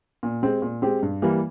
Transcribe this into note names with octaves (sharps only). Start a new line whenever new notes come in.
A#2
G#3 C4 G4
A#2
G#3 C4 G4
G2
E3 G3 A#3